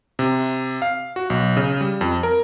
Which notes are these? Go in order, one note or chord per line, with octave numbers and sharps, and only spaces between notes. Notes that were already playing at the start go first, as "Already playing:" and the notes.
C3
F5
F#4
B1
C#3
G3
F2
A#4